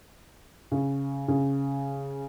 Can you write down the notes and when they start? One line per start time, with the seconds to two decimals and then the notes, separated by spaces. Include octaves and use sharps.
0.72 C#3
1.28 C#3